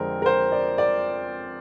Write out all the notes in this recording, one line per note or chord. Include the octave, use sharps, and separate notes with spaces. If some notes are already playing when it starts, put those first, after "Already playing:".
Already playing: F2 D3 G#3 C4 A#4
A#4
C5
D5
D5